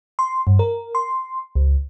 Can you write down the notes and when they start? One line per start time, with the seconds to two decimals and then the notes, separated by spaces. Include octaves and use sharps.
0.19 C6
0.47 G2
0.59 A#4
0.95 C6
1.55 C#2